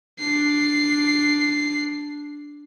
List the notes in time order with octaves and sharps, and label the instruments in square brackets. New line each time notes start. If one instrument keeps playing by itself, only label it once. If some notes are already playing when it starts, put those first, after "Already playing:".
[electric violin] D4 C7